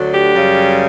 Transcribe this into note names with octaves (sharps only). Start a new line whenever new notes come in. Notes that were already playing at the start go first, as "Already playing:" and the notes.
Already playing: D2 D3 F#3 A3
G4
F#2 C#3 G3